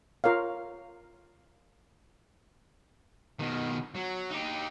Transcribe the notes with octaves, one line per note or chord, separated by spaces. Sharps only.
F4 A#4 C#5 F5
B2 D#3
F#3
D#4 G4